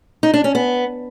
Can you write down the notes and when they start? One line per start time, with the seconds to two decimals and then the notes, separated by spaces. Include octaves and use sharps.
0.23 D#4
0.34 D4
0.44 C#4
0.55 B3